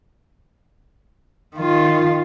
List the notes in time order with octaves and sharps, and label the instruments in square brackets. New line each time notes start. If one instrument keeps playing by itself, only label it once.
[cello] D#3 F4